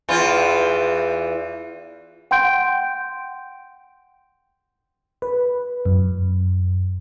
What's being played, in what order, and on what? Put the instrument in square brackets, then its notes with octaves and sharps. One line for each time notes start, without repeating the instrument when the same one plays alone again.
[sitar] E2 E3 F4
[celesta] F#5 G5 C6 G6 D7
[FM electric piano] B4
F#2